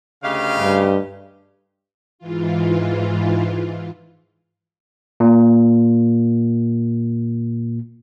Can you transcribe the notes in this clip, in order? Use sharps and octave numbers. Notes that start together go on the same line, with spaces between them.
D2 C#3 G4 D#5 F5
G2
G#2 E3 F4
A#2 A#3